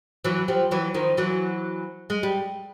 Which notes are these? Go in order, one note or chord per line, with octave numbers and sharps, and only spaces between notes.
E3 F#3
F3 G3
E3 F#3
D#3 F3
E3 F#3
G#3
G3